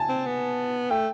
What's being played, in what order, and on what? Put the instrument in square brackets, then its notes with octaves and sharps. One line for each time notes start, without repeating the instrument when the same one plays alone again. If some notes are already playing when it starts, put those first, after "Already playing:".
Already playing: [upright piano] G#5 A5
[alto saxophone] C4
B3
[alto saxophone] A3 [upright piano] G5